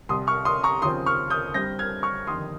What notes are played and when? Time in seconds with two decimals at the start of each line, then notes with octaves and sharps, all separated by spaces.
0.09 C2 C3 G3 C6 D#6
0.27 C#6 F6
0.45 C6 D#6
0.64 A#5 C#6
0.82 D#2 C#3 F3 C4 C6 D#6
1.06 C#6 F6
1.30 D#6 G6
1.54 G2 G3 C4 G6 A#6
1.79 F6 G#6
2.03 C#6 F6
2.27 G1 F2 D#3 G3 C6 D#6